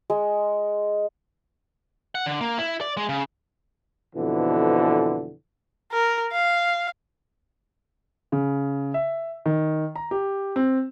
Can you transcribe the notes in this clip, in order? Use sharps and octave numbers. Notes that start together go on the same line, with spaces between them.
G#3
F#5
D3
A#3
E4
D5
G#3
C#3
F2 B2 D3 E3
A#4
F5
C#3
E5
D#3
A#5
G4
C4